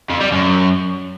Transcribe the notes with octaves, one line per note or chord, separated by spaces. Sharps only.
F2
G3
F#2